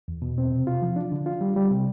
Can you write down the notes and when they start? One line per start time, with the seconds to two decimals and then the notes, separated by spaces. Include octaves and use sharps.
0.08 E2
0.22 B2
0.38 C4
0.52 C3
0.67 F4
0.82 F3
0.96 D4
1.12 D3
1.26 F4
1.41 G3
1.56 G3
1.71 C3